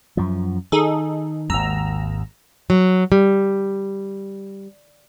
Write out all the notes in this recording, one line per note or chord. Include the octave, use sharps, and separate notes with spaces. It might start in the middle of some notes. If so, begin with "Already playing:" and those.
F#2 F3
D#3 D#4 G#4 A4
G#1 D#2 A#5 E6
F#3
G3